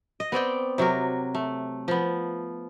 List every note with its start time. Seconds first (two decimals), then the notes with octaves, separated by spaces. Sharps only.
0.20 D#5
0.32 B3 C4 D5 G5
0.78 C3 F#3 F#4 A#4
1.35 A3
1.88 F3 B3